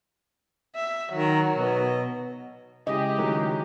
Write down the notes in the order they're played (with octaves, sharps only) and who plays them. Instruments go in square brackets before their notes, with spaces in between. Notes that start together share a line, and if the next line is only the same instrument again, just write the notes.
[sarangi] E5
[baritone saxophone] D#3 [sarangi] F#3
[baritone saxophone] B2
[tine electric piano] C#3 G#3 E4 [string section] G4 G#4 [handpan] D#5
[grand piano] D#3 F#3